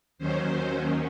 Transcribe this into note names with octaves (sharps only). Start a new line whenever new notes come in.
D#2 D#3 F#3 C#4 C5